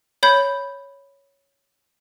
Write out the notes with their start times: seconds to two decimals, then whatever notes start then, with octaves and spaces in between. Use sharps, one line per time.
0.23 C#5 B5 G6